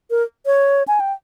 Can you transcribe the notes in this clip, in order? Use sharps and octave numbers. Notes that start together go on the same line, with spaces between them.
A#4
C#5
G#5
G5